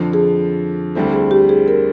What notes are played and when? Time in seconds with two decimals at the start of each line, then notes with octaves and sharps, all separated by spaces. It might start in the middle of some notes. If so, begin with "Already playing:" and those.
Already playing: F2 D3 F3
0.13 G#4
0.95 D2 D3 G3 C4 E4 A4
1.13 G#4
1.31 G4
1.49 G#4
1.68 A#4